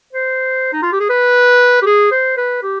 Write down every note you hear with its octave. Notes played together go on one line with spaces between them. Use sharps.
C5
D#4
F4
G4
G#4
B4
G4
G#4
C5
B4
G4